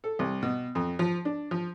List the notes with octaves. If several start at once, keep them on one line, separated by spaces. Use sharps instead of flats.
A4
C2
B2
F2
F3
D4
F3